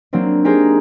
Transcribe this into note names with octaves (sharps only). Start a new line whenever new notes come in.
F#3 A#3 C4 D4
D4 D#4 G4 G#4 A#4 C5